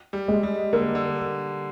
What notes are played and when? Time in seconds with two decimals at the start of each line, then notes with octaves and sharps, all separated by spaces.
0.13 G3
0.28 G#3
0.43 G3
0.73 D3 A#3
0.95 D3